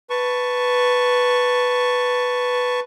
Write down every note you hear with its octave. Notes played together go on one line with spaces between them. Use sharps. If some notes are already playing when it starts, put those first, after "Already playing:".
B4 A5 C#6